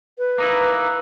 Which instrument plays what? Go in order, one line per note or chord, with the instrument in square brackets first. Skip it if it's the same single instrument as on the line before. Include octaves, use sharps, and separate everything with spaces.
[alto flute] B4
[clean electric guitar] A#3 D#4 E4